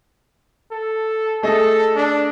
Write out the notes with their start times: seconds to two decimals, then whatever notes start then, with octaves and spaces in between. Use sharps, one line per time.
0.71 A4
1.43 A3 G#4 A4 D#5
1.96 D4